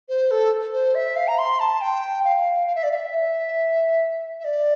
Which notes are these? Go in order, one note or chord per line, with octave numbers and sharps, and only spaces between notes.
C5
A4
C5
E5
F5
A#5
C6
A5
G5
F5
F5
E5
D5
F5
E5
E5
D5